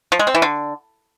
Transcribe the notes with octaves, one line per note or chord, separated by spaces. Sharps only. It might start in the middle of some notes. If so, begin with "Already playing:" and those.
F3
G#3
C4
E3
D3